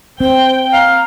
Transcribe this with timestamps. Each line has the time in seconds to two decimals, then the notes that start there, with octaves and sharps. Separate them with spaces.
0.20 C4 C5 G5
0.73 F5 A#5